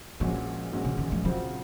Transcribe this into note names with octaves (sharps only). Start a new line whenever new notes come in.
A#1 A#2 F3 G#3 C#4 F#4
A#1 A#2 G#3 C#4 F#4
C#3
D#3
F3
C#3 F3 F#3 C4 F#4